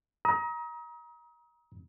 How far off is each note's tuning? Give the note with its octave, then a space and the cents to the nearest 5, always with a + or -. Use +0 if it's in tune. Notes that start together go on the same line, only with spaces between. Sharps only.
A#5 +30 D#6 +35